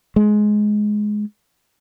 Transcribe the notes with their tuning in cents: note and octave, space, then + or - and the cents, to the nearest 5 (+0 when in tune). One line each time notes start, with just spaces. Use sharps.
G#3 +15